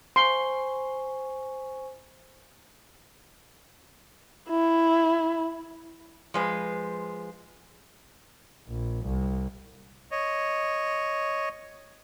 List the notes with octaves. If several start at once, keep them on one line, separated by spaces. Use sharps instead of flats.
C5 G#5 C6 C#6
E4
F3 G#3 B4
A#1
C2
C#5 D#5